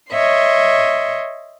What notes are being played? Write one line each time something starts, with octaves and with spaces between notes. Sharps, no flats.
C#5 D#5 E5 C6